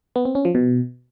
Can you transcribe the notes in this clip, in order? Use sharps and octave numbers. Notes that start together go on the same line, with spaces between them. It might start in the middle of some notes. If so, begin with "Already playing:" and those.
B3
C4
C#4
F3
B2